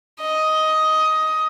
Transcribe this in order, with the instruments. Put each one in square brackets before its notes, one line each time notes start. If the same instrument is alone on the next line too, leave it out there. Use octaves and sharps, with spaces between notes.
[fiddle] D#5